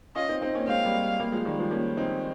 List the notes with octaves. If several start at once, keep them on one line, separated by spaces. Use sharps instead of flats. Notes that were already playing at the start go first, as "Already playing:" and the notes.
C#4 F4 D#5
C4 D#4
C4 D#4
A#3 C#4
G#3 C4 F5
G3 A#3
G3 A#3
F3 G#3
D#3 G3
F3 G#3
A#3 C#4
C4 D#4